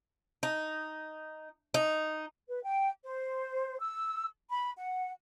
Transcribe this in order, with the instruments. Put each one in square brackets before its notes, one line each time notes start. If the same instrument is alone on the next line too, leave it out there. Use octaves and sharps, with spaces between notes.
[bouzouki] D#4
D#4
[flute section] B4
G5
C5
E6
B5
F#5